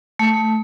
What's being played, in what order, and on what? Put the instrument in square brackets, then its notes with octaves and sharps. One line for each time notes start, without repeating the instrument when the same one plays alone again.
[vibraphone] A3